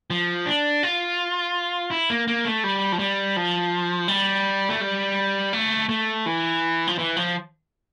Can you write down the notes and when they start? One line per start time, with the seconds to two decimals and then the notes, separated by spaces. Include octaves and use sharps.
0.10 F3
0.46 D4
0.83 F4
1.91 E4
2.10 A#3
2.28 A#3
2.45 A3
2.64 G3
2.92 F3
2.99 G3
3.37 F3
4.08 G3
4.69 A3
4.81 G3
5.53 A3
5.89 A3
6.26 E3
6.87 F3
6.98 E3
7.17 F3